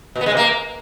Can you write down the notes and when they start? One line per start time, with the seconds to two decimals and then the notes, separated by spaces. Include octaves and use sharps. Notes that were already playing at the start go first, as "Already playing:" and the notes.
0.16 B2
0.21 B3
0.26 G#3
0.32 C3
0.37 A#3